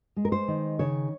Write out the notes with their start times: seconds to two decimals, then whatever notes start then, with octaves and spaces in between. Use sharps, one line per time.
0.16 G#3
0.25 A#4
0.32 C5
0.48 D#3
0.79 C#3 C#5